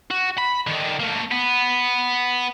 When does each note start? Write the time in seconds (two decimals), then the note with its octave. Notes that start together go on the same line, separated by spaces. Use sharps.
0.11 F#4
0.38 B5
0.67 D3 D#3
1.00 A3 A#3
1.31 B3